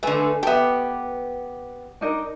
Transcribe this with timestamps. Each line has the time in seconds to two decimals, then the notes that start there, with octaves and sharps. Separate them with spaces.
0.03 D3 A3 B4 G#5
0.43 B3 G4 A4 B4 E5
2.01 D4 D#4 A#4